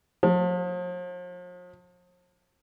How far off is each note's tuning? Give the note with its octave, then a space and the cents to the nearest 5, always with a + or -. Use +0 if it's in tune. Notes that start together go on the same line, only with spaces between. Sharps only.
F3 +45